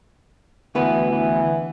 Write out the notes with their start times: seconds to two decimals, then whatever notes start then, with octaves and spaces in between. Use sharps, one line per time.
0.75 D2 E3 B3 B4
1.09 E3